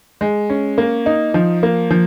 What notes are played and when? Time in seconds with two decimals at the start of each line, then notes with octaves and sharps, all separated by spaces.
0.21 G#3
0.50 C#4
0.78 A#3
1.06 D#4
1.34 F3
1.63 A#3
1.91 F3